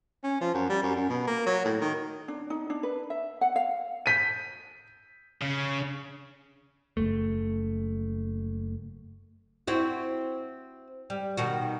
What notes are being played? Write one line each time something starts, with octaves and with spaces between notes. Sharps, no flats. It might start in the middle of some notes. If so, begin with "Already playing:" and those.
C#4
F3
F#2
G3
F#2
F#2
B2
A#3
F#3
A2
D#3
D4
D#4
D4
B4
E5
F#5
F5
G6 B6 D#7
C#3
F#1 A3
C4 E4 F#4
G3
B2 D#3 F#4